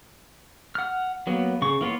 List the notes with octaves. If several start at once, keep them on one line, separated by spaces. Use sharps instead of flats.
F#5 F6
F#3 A#3 B3
C#3 C#6
E3 A#3 B3 F4 C#5